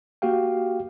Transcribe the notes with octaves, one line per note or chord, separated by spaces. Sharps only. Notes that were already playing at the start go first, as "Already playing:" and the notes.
A#3 F#4 G4 F5 G5